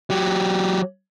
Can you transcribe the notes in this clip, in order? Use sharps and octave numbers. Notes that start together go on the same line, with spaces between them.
F#3 G4